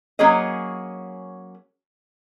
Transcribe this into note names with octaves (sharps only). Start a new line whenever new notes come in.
F#3 A#3 C#4 G#4 C#5 D#5